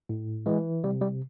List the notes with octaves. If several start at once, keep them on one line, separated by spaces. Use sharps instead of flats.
A2
E3 G#3
C3 G3
G3